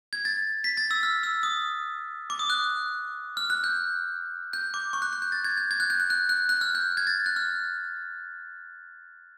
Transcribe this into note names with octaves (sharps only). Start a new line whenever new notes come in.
G#6
A6
B6
A6
E6
F6
E6
D#6
D6
D#6
F#6
F6
F#6
G6
G6
D6
C#6
F#6
F#6
G6
A6
G#6
G6
G#6
F#6
G6
F#6
F#6
F#6
F#6
F6
G6
G#6
A6
F#6
F6